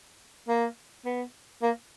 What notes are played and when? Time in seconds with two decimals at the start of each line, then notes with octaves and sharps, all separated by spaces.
0.48 A#3
1.05 B3
1.62 A#3